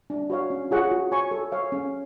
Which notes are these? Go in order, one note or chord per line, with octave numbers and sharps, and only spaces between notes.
D4
F#4 C#5 F5
C#4
F4 G#4 C#5 F#5
F#4
C#5 G#5 C#6
A4
C#5 F5
C#4